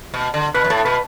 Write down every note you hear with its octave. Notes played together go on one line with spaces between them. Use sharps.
B2
D3
B2 B4
F#2
A2 A4
B2 B4